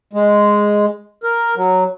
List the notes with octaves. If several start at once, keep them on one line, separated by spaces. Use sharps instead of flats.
G#3
A#4
F#3